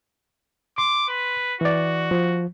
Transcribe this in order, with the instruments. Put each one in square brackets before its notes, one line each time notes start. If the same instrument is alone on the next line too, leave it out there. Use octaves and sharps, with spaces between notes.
[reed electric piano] C6 [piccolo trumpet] D6
[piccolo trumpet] B4
[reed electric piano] E3 D5 [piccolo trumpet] F#4
[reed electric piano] F3